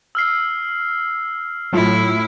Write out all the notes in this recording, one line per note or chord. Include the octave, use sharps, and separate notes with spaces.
E6 F6 C7
A2 F#3 A3 E4 F4